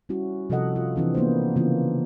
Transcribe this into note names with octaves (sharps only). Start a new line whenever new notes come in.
G3 C#4 E4 F#4
C3 F3 F#4 A4 D#5 F#5
F4
E3 C4 D4
A#3 B3 D4 C5
C#3 E3 A#3 B3 C#4 F4